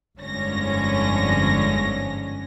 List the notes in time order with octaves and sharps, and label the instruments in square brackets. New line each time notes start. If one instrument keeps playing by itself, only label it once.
[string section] G1 F2 G#2 D3 C#4 A#6